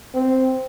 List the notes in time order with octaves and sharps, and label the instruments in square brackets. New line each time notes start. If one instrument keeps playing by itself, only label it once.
[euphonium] C4